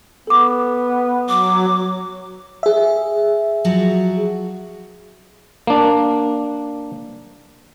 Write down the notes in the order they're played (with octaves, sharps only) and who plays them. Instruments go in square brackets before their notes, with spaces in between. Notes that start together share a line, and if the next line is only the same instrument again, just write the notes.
[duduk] B3 [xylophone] A4 D6
[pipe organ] F#3 [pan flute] D6
[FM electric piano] G#4 E5
[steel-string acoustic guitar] F3 F#3 F#4
[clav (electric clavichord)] A#3 D4